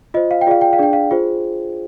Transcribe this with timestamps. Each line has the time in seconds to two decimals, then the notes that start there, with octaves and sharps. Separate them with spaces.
0.14 F4 C5 D#5
0.31 F5
0.41 G5
0.47 F4 G#4 D5 F5
0.61 G5
0.73 F5
0.78 D4 G#4 D5 G5
0.93 F5
1.11 F4 G#4 C5